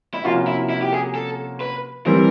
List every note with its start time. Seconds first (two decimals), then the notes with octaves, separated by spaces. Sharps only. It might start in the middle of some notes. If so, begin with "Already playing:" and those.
0.14 E4
0.24 C3 F3 A#3 C#4 F4 F#4
0.47 E4
0.70 E4
0.82 G4
0.92 G#4
1.15 A4
1.61 B4
2.06 E3 G3 C4 E4 A#4